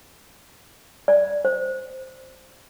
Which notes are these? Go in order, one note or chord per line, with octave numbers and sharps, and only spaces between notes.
D5
C5